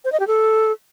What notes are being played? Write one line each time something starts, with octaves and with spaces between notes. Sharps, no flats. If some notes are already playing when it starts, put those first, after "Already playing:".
C5
D#5
G4
A4